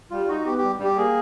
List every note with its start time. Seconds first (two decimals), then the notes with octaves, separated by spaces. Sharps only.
0.11 G3 F4
0.28 D#4 F#4
0.40 F#4
0.46 B3 G4
0.58 G3 G4
0.80 G3 G4
0.97 A#3 G#4